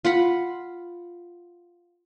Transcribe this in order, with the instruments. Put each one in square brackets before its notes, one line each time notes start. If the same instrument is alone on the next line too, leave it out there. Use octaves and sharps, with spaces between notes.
[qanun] F4 F#5 B5